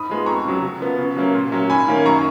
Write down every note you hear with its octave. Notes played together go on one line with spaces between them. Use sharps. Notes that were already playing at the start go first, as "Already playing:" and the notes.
Already playing: G#2 B5 D#6
F3 G#3 B3
F2 A#5 C#6
C#3 F#3
C#3
F3 B3
C#3
F#3 A#3 C#4
A#2
F#3 C#4
G#2 G#5 B5
D#3 A#3 C#4
F#2 A#5 C#6